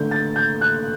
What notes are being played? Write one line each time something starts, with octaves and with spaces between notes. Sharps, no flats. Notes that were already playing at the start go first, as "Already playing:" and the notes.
Already playing: D3 A3 G6
A6
G6
F#6